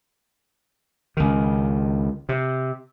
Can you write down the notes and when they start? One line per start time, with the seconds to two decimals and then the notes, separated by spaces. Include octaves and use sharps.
1.17 C#2 D#3
2.29 C3